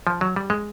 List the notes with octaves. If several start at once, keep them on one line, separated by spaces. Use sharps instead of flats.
F3
F#3
G3
G#3